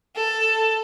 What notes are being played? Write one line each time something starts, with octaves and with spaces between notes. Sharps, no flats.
A4